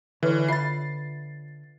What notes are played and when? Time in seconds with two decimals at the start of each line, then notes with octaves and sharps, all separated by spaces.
0.23 D3 E3 A4 B4 C#5
0.49 F4 E5 B5 A6 C7